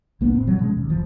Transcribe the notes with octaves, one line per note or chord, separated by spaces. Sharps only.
C2 A#3 B3 D4
F1 A2 C4
A2 E3 F#3 G3
B2 F3 G#3 C#4
D#2
F#1 E3 F3